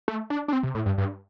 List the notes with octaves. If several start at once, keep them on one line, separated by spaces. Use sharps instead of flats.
A3
D4
D4
C4
C3
A2
G2
G2